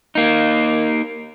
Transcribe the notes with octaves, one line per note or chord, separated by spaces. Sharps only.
A#3 D#4